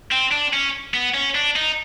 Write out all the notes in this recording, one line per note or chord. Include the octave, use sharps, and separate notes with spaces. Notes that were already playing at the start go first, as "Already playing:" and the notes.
C4
D4
C#4
B3
C#4
D4
D#4